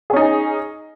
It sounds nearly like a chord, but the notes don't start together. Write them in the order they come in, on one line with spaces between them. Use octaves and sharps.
G#4 C#4 D#4